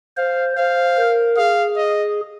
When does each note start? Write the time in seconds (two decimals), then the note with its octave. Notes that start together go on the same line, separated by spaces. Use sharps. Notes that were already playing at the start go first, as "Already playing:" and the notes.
0.17 C5 F5
0.57 C5 F5
0.97 A#4
1.37 G#4 F5
1.77 D#5